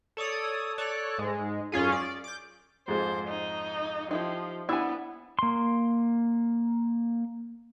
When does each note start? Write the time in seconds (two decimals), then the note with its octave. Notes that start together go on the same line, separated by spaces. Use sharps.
0.17 A4 C#5 D5 D#6
0.78 A4 C#5 D5 F#6
1.18 G#2 G#3
1.72 F#2 C#4 F4 G#4
1.92 D5
2.24 D6 G6
2.88 F2 G#2 G#3 C5
3.28 D#4
4.11 F3 D#4 E4 G4
4.69 B3 D4 E4 G#5 E6
5.39 A#3 C6